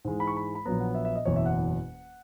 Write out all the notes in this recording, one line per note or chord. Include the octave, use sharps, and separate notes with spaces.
G#2 E3 G#3
B5
C#6
B5
B5
A#1 A#2 F#3 B3 A#5
F#5
E5
E5
D#5
F#1 E2 B2 F#3 C#5
E5
F#5